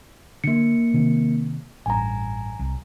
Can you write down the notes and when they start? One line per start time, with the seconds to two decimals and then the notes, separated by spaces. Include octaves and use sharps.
0.44 D3 A#3 C#7
0.94 C3 D#3 C4
1.86 A1 G2 G#5 A#5
2.59 C2